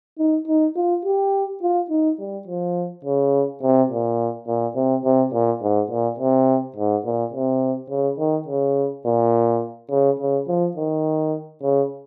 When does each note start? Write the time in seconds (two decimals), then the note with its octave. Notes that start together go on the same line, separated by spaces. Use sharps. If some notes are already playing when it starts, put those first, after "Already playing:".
0.19 D#4
0.47 D#4
0.75 F4
1.05 G4
1.62 F4
1.90 D#4
2.19 G3
2.47 F3
3.04 C#3
3.62 C3
3.90 A#2
4.47 A#2
4.75 C3
5.04 C3
5.33 A#2
5.62 G#2
5.90 A#2
6.18 C3
6.76 G#2
7.05 A#2
7.33 C3
7.90 C#3
8.19 D#3
8.47 C#3
9.05 A#2
9.90 C#3
10.19 C#3
10.48 F3
10.76 D#3
11.62 C#3